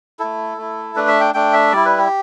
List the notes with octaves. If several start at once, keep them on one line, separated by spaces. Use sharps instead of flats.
A3 E4 A4
A3 E4
A3 D4 B4
E5
G5
A3 D4 G5
E5
G3 E4 D5
B4
G4